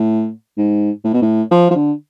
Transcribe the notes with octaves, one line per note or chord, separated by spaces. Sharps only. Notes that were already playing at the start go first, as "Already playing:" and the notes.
Already playing: A2
G#2
A2
B2
A2
F3
F3
D3